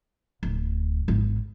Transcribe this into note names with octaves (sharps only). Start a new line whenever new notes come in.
D1
G#1